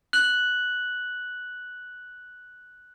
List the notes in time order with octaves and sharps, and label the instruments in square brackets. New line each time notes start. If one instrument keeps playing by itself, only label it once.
[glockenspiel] F#6 F#7